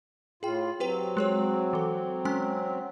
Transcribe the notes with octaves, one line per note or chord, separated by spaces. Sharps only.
A2 F4 G#4 G5
F#3 C4 G4 B4 G5
G#3 G#4 C#5
E3 A4
G#3 C#4 G#5